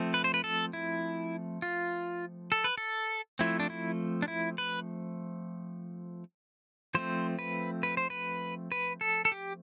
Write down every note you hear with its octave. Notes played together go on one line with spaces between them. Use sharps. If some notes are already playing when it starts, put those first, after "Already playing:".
Already playing: F3 A3 C4
B4
C5
B4
A4
E4
F4
A4
B4
A4
F3 A3 C4 E4
D4
E4
D4
E4
B4
F3 A3 C4 C5
B4
B4
C5
B4
B4
A4
A4
G4